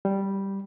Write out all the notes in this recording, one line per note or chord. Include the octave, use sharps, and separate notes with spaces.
G3